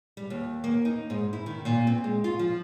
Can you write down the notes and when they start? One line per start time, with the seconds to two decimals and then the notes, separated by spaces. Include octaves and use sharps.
0.17 G3
0.30 D#2
0.64 A#3
0.85 D#4
1.10 G#2
1.33 E4
1.46 D#3
1.65 A#2
1.87 C4
2.04 G#3
2.24 F4
2.39 F3